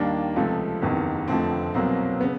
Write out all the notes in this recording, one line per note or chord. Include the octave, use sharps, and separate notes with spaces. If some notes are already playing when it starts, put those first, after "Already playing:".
Already playing: D#2 D#3 G3 A#3 D4
C#2 C3 F3 A3
F#1 E2 C3 D#3
F1 F2 D3 F3 A3 C4
C2 B2 F#3 A#3 C4
C#3 B3